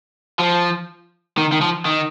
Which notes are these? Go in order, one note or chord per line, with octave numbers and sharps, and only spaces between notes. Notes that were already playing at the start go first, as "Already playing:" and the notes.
F3
D#3
D#3
F3
D#3